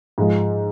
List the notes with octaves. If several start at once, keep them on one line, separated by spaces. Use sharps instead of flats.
G#2 F3 G#3